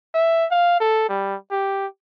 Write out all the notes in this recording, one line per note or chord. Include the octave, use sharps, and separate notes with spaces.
E5
F5
A4
G3
G4